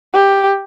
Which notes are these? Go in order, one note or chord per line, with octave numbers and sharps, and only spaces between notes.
G4